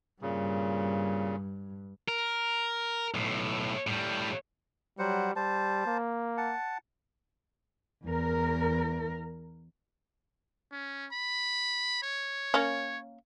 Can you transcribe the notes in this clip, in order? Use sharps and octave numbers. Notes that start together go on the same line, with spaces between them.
G2 A#2 C#3
A#4
B1 A2
A2 G3
F#3 G3 C5 F#5
G3 C5 A5
A#3
F#5 A5
E2 A#4
C#4
B5
C#5
A#3 C#4